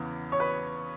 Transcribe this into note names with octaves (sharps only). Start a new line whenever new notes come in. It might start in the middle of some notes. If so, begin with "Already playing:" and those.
Already playing: E2 C#3 E3 B3
C#5
B4